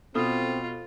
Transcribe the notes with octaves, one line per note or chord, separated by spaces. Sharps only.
B2 C4 F4 A4